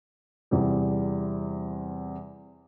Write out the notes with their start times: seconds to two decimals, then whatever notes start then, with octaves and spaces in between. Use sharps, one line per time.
0.51 E2 C3 G3